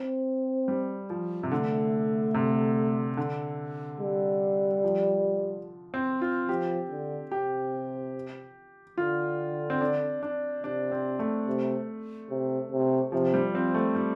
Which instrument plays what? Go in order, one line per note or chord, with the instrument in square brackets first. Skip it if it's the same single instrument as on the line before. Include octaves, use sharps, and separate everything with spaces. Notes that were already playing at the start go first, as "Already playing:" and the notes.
Already playing: [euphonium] C4
[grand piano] G3
F3
C3
[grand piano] D3 [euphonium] A3
[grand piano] C3
D3
[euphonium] G3
[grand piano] F3
C4
F4
[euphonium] F3 [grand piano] G4
[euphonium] D3
[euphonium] C3 [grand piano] G4
[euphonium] D3 [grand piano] F4
[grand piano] C4
D4
D4
[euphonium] C3 [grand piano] D4
[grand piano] C4
A3
[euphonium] C3
C3
C3
[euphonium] C3 [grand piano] F3
[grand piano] G3
[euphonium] F3 [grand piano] C4
[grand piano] A3
G3